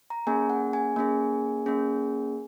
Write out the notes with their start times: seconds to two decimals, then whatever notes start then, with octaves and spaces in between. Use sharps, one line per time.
0.10 A#5
0.27 A#3 C#4 G#4 G#5
0.50 F#5
0.73 G#5
0.96 A#3 C#4 G#4
1.66 A#3 C#4 G#4